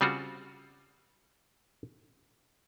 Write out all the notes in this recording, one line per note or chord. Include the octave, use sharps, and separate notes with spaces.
C#3 G3 C4 F4 F#4